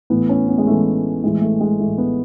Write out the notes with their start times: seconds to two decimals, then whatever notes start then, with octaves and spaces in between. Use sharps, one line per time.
0.10 A2 E3 B3
0.29 C#4
0.48 B3
0.58 G#3
0.67 A2 E3 A3
1.23 A2 E3 G#3
1.42 A3
1.61 G#3
1.80 A2 E3 A3
1.98 B3